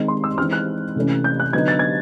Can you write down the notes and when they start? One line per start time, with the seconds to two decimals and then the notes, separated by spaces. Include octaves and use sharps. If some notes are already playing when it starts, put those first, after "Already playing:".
Already playing: D#3 G#3 C4 D#4
0.08 C6
0.24 E6
0.38 E3 G#3 C4 D#4 F6
0.53 F#6
0.96 C3 E3 A3 C#4
1.24 G6
1.40 F#6
1.53 D3 F#3 B3 D#4 G#6
1.68 A6
1.79 G#6